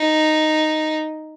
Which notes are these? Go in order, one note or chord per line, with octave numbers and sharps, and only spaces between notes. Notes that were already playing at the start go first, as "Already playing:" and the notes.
Already playing: D#4